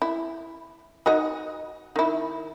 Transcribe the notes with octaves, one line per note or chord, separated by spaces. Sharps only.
E4
D#4 F#4 D#5
D#3 E4